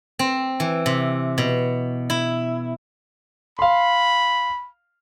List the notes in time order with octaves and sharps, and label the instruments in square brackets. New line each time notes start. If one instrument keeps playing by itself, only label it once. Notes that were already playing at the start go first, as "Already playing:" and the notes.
[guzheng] C4
E3
C3
B2
E4
[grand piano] F5 C6 [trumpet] B5